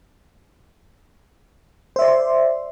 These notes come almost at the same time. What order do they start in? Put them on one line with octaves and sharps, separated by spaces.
C5 E5 D5 C6